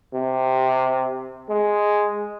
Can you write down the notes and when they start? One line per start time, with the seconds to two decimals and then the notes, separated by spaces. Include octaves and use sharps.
0.14 C3
1.49 G#3